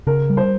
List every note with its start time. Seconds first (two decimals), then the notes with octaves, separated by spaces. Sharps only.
0.07 C#3 A#4
0.30 G3
0.37 C5